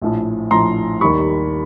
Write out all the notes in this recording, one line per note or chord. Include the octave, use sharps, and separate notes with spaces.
A#1 A2 F3
A#1 A2 F3 A#5 C6
D#2 D#3 G3 B5 C#6